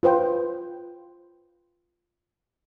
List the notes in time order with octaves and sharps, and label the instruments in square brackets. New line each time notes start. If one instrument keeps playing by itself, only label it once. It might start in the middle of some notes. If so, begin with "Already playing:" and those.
[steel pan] F4 B4 C5 G5